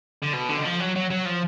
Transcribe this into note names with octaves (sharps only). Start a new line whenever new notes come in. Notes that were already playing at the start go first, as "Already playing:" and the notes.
D3
B2
D3
D#3
F3
F#3
F#3
F#3
F3